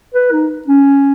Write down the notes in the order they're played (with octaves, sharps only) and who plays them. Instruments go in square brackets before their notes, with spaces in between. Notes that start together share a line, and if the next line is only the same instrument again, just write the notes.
[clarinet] B4
D#4
C#4